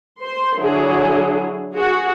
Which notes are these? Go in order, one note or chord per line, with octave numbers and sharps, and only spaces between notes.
C5 C6
D3 F#3 E4 G#4
F#4 G#4